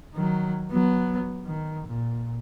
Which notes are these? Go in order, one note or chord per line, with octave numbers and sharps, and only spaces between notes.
D#3 F#3
F#3 B3
D#3
A#2